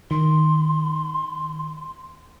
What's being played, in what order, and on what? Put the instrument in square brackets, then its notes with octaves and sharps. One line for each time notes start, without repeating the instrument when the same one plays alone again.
[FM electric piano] D#3 [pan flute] C6